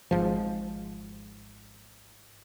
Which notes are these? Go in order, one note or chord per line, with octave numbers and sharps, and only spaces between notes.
G#1 G#2 F3